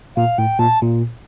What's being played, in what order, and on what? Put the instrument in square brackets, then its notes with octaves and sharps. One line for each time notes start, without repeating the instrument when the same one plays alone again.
[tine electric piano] A#2 [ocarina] F5
[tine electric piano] A2 [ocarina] G5
[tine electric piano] A#2 [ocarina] A5
[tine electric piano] A#2